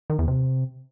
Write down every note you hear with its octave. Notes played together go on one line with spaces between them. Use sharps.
D#3
E2
C3